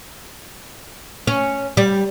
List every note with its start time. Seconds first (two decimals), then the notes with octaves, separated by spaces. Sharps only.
1.27 C#4
1.77 G3